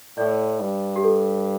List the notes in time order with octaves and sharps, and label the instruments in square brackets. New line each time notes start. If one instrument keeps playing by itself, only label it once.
[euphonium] A2 [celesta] D5
[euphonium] G2
[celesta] G4
A4